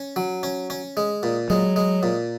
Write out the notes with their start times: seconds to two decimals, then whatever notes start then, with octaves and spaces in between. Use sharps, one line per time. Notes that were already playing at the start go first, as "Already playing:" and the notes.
Already playing: C#4
0.16 F#3
0.43 C#4
0.70 C#4
0.97 G#3
1.23 A#2
1.50 F#3 G#3
1.76 G#3
2.03 A#2